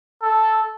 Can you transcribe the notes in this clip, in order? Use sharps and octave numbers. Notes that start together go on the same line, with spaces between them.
A4